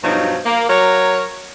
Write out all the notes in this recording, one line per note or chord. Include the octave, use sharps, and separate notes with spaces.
G2 B2 F3 F#3 D#4
A#3
F#3 A#4 C#5